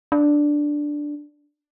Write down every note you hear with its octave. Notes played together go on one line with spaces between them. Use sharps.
D4